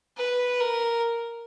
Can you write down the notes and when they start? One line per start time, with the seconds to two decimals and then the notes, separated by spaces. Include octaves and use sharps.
0.17 B4
0.61 A#4